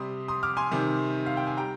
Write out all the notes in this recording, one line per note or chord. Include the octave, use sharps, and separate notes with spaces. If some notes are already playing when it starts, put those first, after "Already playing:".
Already playing: C3 G3 C6 D#6
C6 D#6
D6 F6
G#5 C6
C3 D#3 G3
F5
G5
G#5
G3 G5 A#5